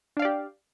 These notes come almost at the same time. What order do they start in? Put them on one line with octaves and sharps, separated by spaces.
D4 F5 D5 G4